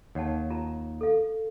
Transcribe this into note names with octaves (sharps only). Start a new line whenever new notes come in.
D#2 C#5 F#5 A5
F4 A5 A#5
A4 F5